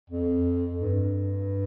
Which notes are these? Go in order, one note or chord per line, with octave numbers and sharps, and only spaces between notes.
F2
G2